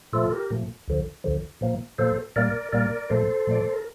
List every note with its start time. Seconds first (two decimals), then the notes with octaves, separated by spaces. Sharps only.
0.13 A#2 F3 A3 F4 A4
0.31 G4 A#4
0.50 A#2 F3 A3
0.88 D2 D3 F3
1.24 D2 D3 F3
1.61 A#2 F3 A#3
1.98 A#2 F3 A#3 A4 C5
2.36 A#2 G3 A#3 A#4 D5
2.72 A#2 G3 A#3 A#4 D5
3.09 A#2 F3 A3 A4 C5
3.47 A#2 F3 A3 D5
3.63 C5
3.73 A#4